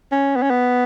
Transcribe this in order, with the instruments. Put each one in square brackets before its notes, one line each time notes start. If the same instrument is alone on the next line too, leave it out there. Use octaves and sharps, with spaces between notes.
[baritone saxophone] C#4
B3
C#4
B3